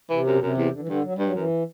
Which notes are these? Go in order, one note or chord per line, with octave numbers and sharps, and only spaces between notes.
C3 E3
F#2
B2
F#2 C3
E2
D3
E3
G2 D3
F#3
G3
G2
F#3
F#2 E3